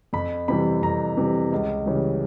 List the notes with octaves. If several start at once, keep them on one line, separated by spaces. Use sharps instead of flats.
F2 B5
C3 E3 G3 B5
F2 A#5
C3 E3 G3
C#2
C#3 E3 G3